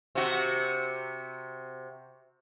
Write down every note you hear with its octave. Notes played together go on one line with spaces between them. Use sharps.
C3 F#4